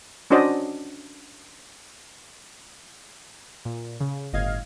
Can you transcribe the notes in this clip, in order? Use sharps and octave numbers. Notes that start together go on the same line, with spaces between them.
C#4 D4 F#4 C5 D5 D#5
A#2
C#3
G1 A2 D#5 F5 F6 G#6